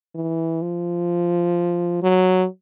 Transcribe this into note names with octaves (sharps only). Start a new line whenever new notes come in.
E3
F3
F#3